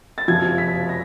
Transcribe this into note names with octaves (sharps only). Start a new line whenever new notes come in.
A6
F#1 F2 C3 F3 G#6
B6
A#6